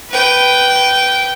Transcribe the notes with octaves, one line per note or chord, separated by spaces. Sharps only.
B4 G5